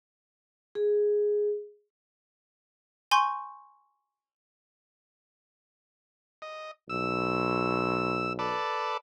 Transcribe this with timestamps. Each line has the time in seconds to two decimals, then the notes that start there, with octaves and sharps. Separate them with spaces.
0.75 G#4
3.11 G#5 C6 C#6 G6
6.42 D#5
6.89 B1 E6
8.39 A4 B4 D5